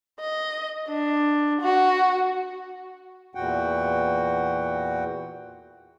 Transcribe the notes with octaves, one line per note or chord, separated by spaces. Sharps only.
D#5
D4
F#4
E2 A#2 F#4 F#5 G5